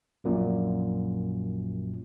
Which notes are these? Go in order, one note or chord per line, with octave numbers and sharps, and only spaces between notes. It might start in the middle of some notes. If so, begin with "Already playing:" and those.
A#1 F#2 A#2